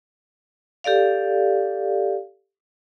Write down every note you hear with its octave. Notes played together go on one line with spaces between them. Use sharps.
G4 A4 D5 F5